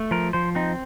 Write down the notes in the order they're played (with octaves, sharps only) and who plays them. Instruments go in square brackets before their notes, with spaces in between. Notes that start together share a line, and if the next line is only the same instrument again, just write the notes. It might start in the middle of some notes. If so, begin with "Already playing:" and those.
Already playing: [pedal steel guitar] A3
F3 A#4
F3 C5
C4 D#4